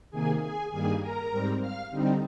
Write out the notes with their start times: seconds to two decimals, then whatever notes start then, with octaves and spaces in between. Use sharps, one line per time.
0.11 C3 D#3 A#3 G#4 G#5
0.41 G#4 G#5
0.71 G2 D#3 G3 A#3 G#4 G#5
1.00 A#4 A#5
1.31 G#2 G3 C4
1.60 F5 F6
1.91 D3 G3 C4 D#4